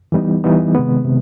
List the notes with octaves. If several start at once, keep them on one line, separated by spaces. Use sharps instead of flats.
E3 G3 B3 D#4
E3 G3 B3 D#4
C3 D#3 G#3 B3
C3